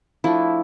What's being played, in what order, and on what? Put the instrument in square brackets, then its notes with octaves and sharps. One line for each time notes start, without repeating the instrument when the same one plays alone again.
[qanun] F3 A3 D4 E4